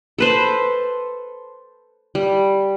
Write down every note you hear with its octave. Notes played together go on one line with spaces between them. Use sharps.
A4 B4 C5
G3